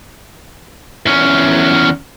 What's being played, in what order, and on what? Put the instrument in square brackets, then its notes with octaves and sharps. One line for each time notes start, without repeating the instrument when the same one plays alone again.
[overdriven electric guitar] E2 C#4